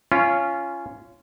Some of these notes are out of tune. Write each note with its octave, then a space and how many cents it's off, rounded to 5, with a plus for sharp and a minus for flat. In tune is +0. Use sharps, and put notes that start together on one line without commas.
C#4 +0 F4 -20